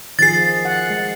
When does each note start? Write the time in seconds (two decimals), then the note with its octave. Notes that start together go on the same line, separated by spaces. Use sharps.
0.19 D#3 F3 G#4 A6 C7
0.65 F#5
0.90 G#3